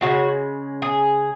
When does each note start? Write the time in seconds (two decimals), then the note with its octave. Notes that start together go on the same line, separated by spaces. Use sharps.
0.01 C#3 G#3 F#4
0.82 G#4